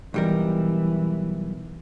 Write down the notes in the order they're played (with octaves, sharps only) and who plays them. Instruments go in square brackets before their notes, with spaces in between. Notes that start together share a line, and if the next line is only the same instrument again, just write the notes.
[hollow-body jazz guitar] B1 G3 A#4 [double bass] E3